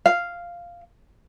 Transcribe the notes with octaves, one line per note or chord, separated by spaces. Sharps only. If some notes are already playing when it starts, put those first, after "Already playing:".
F5